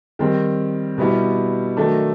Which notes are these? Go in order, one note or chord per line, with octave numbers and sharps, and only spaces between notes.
D#3 G3 C4
B2 G3 B3 E4 G4
D#3 F#3 A3 D4